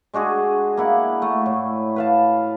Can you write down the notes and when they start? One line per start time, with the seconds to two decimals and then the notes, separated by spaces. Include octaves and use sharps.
0.14 G#3 D4 F#4 G#4
0.77 A#3 E4 F#5
1.22 A3
1.46 A2
1.96 B4 F5 A5